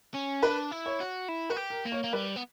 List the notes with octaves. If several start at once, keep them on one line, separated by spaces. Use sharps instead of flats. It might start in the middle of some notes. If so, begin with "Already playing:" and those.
C#4
D4 B4
E4
C#5
F#4
E4
F#4 B4
G4
A#4
A#3
C#5
A#3
G3 B4
B3